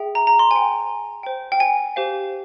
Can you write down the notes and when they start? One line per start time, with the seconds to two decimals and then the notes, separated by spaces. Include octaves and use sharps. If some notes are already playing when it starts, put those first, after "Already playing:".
Already playing: G#4 E5 G5
0.15 A#5
0.27 A#5
0.39 C6
0.51 C5 G5 G#5
1.23 C5 G5
1.52 G5
1.60 G#5
1.96 G4 C5 F5